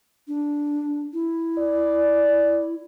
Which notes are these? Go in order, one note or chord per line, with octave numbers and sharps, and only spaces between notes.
D4
E4
D5